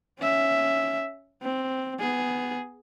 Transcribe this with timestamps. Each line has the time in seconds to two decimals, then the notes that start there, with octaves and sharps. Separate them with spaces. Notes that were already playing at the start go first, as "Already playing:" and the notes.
0.19 C#4 E5
1.42 C4
2.00 B3 G#4